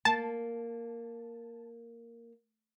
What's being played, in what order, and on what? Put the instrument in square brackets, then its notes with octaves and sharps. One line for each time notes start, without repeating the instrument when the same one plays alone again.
[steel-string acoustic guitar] A#3 [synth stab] A5